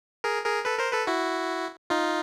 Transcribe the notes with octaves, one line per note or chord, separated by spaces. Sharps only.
G#4 A#4
G#4 A#4
A4 B4
A#4 C5
A4 B4
E4 F#4
D#4 F4